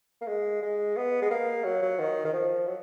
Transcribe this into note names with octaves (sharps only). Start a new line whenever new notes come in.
A#3
G#3
G#3
B3
G#3
A#3
F#3
F#3
D#3
D#3
F3
F#3